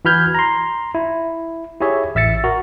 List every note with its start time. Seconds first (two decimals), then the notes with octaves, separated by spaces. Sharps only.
0.05 E3 F#4 B5 F6 G6 G#6
0.34 A#5 C6
0.95 E4
1.81 E4 G4 G#4 C#5 E5
2.15 A1 E5 E6 A6 C#7
2.44 F#4 A#4